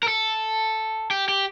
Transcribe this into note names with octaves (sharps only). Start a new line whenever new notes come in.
A#4
A4
G4
G4